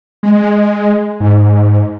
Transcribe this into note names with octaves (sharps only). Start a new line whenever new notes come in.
G#3
G#2